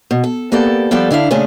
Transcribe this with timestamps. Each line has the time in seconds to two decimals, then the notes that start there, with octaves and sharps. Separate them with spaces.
0.11 B2
0.24 A4
0.52 A#3 B3 G4 A4 D5
0.91 F3 G3 B3 A4 D5
1.11 D3 D4 E4 F5
1.31 A#2 C#3 A3 C#4 D4 G#4